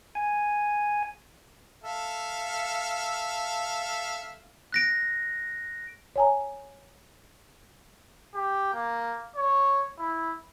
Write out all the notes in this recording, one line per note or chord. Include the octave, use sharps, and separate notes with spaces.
G#5
A4 E5 F5
F#6 A#6 D7
C#5 G#5 A#5
G4
A#3
C#5
E4